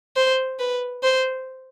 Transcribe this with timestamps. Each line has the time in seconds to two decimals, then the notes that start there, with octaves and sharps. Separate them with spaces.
0.17 C5
0.59 B4
1.03 C5